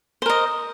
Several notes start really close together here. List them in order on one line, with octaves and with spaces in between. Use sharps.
C5 A#4 D#5